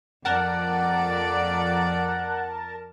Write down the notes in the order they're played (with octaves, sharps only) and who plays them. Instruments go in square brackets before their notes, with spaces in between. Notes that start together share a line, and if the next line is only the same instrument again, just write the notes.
[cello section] F2 D5 [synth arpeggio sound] A#4 A5 [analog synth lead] F#5